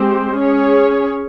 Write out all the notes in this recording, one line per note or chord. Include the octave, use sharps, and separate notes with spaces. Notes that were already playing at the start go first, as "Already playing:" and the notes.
Already playing: G#3 C4 G4 C5
C#4 G#4 C#5